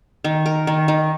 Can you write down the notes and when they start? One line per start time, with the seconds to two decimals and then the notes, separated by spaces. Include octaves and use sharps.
0.24 D#3
0.46 A#4
0.67 D#3
0.88 D#3